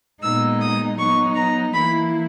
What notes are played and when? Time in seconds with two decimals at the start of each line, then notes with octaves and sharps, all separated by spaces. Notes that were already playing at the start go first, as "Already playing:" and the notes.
0.22 A#2 G#3 B3 D#4 E6
0.60 D#6
0.98 F#3 B3 D#4 C#6
1.35 A#5
1.73 E3 A#3 E4 B5